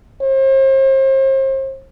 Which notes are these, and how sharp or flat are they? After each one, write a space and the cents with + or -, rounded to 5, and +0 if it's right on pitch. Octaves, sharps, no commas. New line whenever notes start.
C5 +40